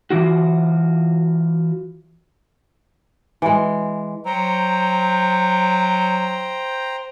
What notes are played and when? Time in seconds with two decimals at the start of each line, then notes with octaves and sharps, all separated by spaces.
0.10 E3 F4 F#4
3.42 E3 G#3
4.26 F#3 C5 G5 A#5